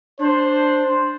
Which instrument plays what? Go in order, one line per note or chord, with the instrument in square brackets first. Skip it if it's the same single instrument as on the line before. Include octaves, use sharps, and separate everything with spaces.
[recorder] D4 [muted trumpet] C5